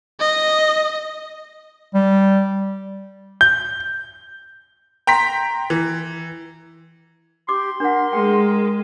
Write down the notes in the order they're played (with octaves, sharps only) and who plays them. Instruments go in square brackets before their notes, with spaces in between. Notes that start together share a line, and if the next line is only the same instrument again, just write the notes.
[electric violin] D#5
[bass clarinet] G3
[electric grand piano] G6
[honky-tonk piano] G5 A#5 C6 B6
E3
[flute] G4 [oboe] C6 [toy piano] D6
[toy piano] D4 F#5 [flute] A#4
[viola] G#3 [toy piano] G5